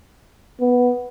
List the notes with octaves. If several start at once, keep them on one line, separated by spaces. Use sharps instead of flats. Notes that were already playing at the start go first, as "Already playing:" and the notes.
B3